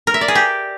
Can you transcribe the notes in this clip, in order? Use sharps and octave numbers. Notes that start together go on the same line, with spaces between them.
A#4
E5
D5
G#4
G4